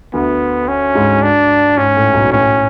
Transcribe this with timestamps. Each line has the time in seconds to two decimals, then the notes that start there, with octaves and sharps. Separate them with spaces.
0.13 D2 D3 B3
0.68 C#4
0.95 G#2 G#3
1.23 D4
1.77 G#2 C#4
1.96 A2
2.14 B1 B2
2.32 A2 C#4